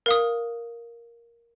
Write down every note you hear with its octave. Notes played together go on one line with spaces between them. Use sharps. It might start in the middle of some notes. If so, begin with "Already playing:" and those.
A#4 F5 D#6